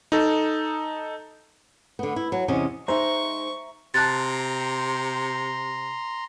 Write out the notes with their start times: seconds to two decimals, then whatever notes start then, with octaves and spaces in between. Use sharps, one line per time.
0.12 D#4 A4
1.99 D3 B3
2.16 E4
2.32 F#3
2.48 E2 C3 C#4 D#5
2.88 G#3 D#4 C5 E5 A#5 C#6
3.94 C3 A5 A#5 C6 F#6 A6